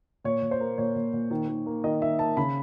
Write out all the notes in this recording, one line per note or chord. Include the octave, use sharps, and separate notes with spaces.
A#2 C#5
A#2
C5
A#3
A#2 C#5
A#2
A#2
D#3
D#3
A#3
D#3 D#5
D#3 E5
A#3 A5
C#3 B5